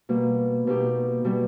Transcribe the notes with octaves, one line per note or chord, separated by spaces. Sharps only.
B2 G3 A#3
B2 A#3 D#4 G4
B2 G3